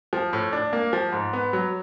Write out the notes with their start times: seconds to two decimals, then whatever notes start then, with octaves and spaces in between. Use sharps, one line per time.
0.13 F3
0.33 A2
0.53 D4
0.73 A#3
0.93 F3
1.12 G#2
1.33 B3
1.53 F#3